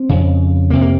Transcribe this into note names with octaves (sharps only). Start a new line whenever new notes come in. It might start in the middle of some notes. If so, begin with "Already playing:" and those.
Already playing: C4
F2 C#3
F2 C3 A#3
A#3